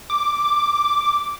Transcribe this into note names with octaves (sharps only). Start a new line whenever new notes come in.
D6